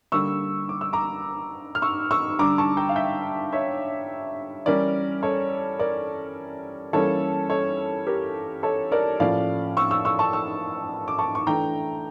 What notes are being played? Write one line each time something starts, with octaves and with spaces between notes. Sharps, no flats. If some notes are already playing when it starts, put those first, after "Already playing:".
D3 G3 A#3 C#6 E6
D6
E6
A#5 D6
F6
C#6 E6
C#6 E6
D3 G3 D4 A#5 D6
A5 C#6
G5 A#5
F5
E5 G5
C#5 E5
E3 G3 C#4 A#4 D5
A4 C#5
A#4 D5
E3 G3 A#3 C#4 A4 C#5
A4 C#5
G4 A#4
A4 C#5
A#4 D5
A2 F3 A#3 C#4 D5 F5
C#6 E6
C#6 E6
C#6 E6
A5 C#6
C#6 E6
D6
A5 C#6
C#6
E3 A3 D4 G5 A#5